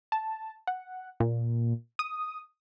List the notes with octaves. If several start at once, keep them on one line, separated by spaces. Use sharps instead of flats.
A5
F#5
A#2
D#6